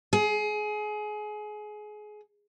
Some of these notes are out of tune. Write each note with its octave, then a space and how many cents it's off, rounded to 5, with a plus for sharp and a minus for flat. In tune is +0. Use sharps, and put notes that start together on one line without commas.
G#4 +25